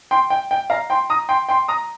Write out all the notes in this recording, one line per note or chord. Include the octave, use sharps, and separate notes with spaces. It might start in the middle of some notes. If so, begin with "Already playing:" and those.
G5 C6
G5
G5
F5 A#5
G5 C6
A#5 D#6
G5 C6
G5 C6
A#5 D#6